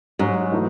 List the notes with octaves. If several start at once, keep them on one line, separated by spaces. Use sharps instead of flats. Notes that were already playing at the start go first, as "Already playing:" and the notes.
G#2 F#3 C#4 F#4
E3 A3 D#4 F#4